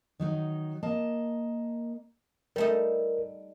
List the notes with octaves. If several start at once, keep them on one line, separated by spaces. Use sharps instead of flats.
D#3 F#3 D#4
A#3 D#5 A5
G3 A3 D#4 A#4